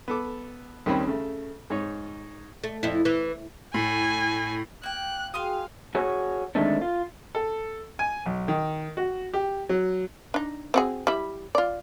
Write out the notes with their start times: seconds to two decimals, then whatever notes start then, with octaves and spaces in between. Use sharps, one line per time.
0.08 B3 A4 D6
0.86 D#2 D#3 G3 C4 C#4 B5
1.07 C#3 A3
1.70 G#2 D#4 C#5
2.63 A3
2.83 F2 E4
3.05 E3
3.74 A2 G#5
4.83 A#3 G5 F#6
5.34 F#4 G#4 F5 G5 G#5 C6 D#6
5.95 F#4 G#4 C#5
6.55 D3 D#3 G#3 A3 C4 D4
6.82 F4
7.35 A4
7.99 G#5
8.26 B1
8.48 D#3
8.97 F#4
9.34 G4
9.69 F#3
10.34 D4 D#4
10.74 C4 F#4 G#4
11.07 G3 E4
11.55 F4 D5